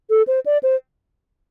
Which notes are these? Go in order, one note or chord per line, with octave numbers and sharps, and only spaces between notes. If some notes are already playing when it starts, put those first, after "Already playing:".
A4
C5
D5
C5